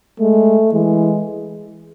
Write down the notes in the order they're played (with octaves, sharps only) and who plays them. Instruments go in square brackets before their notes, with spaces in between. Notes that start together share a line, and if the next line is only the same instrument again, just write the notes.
[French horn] G#3 [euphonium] A3
[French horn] E3 [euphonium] G#3